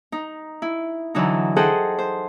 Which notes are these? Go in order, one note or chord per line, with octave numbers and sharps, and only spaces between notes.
D#4
E4
D3 E3 F#3 D#4
G#4 A4 C5 D#5 F#5 G5
C5